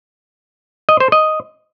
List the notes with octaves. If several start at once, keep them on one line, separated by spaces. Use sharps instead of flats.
D#5
C5
D#5